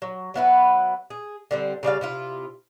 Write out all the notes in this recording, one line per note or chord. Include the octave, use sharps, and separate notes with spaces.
F#3
F#3 B3 E4 B4
G#4
D3 G3 C4
C#3 G3 D5 F5
C3 E4 F4